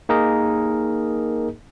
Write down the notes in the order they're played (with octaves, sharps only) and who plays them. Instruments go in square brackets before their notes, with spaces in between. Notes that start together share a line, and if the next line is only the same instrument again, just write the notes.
[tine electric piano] A#3 D#4 G#4 A#4 D#5